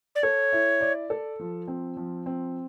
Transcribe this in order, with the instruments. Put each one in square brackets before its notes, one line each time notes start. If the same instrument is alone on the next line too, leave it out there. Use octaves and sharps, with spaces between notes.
[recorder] D5
[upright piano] A4 [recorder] C#5
[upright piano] E4
D5
A4
F3
C4
F3
C4